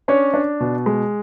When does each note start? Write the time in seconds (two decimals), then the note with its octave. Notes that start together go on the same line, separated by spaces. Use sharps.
0.08 C#4 D4 C#5
0.34 D4
0.60 B2
0.86 G#3